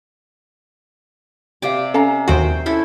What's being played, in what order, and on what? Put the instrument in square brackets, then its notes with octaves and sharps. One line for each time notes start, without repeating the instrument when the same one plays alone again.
[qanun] C3 D5 D6 [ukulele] G4 F5
[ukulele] C#4 F5 A#5 [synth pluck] A4
[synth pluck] D#2 F#4 [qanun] C5 G5
[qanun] C#4 E4 A4